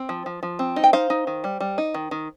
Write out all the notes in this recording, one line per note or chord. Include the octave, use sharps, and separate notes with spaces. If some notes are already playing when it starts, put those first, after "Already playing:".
Already playing: C4
F3
F3
F3
C4
D#4
G5
D#4 C5 F5
D#4
D#3
G3
G3
D#4
D#3
D#3